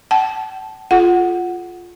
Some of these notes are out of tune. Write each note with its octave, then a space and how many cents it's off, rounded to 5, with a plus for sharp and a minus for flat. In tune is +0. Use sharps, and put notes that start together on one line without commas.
F#5 +45 A5 -20
F4 +0 A4 -45 F#5 +0